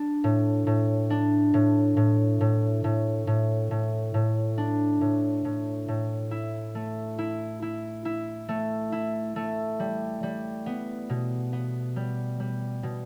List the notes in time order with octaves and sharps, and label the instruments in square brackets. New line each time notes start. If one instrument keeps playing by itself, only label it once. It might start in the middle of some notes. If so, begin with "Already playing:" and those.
Already playing: [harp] D4
A2
A2
D4
A2
A2
A2
A2
A2
A2
A2
D4
A2
A2
A2
E4
A3
E4
E4
E4
A3
E4
A3
G3
G3
B3
B2
B3
G3
G3
B2